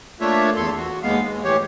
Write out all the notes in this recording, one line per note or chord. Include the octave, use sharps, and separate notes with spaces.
A3 A#3 D4 F4 C#5 E5
E2 A4 C6
F#4
D#2 G#3 B3 F5
G#3
A2 E3 G4 C#5